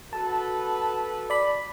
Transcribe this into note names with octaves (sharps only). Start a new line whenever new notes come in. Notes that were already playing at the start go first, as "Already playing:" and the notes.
F#4 A4 B4 A5
D5 B5